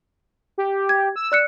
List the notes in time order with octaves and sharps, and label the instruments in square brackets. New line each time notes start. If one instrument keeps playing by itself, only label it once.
[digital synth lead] G4
[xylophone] G#6
[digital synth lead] E6
[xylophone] D5 F#6 C#7